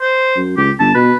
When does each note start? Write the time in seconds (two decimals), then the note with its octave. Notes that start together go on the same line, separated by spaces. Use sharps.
0.01 C5
0.36 F#2
0.57 C#2 G4
0.79 G1 A5
0.95 B2 B4